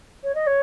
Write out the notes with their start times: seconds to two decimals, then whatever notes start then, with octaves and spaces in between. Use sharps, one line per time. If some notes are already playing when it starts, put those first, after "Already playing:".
0.23 C#5
0.34 D#5
0.46 C#5